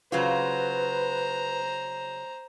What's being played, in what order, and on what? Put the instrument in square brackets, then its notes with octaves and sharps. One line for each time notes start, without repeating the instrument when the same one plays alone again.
[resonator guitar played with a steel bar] C#3 F#3 F4 [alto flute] B4 [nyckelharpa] C5 A#5